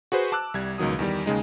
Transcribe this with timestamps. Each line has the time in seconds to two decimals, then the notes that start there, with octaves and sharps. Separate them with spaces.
0.12 F#4 G#4 B4 C5
0.32 A5 D6 E6 F#6
0.54 C2 G3 G#6
0.78 C#2 B2 D#3 F#3 D#6
0.99 E2 D#3 G3
1.26 D#2 C#3 G#3 D#4